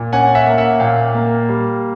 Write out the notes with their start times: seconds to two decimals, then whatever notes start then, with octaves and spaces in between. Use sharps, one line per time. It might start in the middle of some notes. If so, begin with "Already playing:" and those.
Already playing: A#2
0.13 C#4 F#5 G#5
0.35 E5 F#5
0.47 A#3
0.58 E5 F#5
0.80 A#2 F5 G5
1.14 A#3
1.49 G3